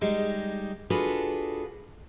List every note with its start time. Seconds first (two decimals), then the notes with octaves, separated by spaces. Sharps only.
0.01 G3 G#3 D#4
0.90 D4 F4 F#4 G#4 A4 B4